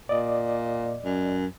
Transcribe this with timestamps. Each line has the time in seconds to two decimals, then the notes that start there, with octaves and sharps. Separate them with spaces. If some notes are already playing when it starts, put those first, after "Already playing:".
0.09 A#2 D5 D#5
1.04 F#2